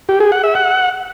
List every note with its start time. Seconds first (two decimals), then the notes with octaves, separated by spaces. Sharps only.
0.09 G4
0.20 G#4
0.32 F#5
0.43 E5
0.55 F#5